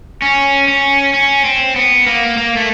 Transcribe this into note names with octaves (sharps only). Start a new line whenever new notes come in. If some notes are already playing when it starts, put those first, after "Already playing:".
C#4
C#4
C#4
C4
B3
A#3
A#3
A3